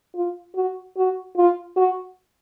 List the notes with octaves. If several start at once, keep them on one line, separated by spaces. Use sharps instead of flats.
F4
F#4
F#4
F4
F#4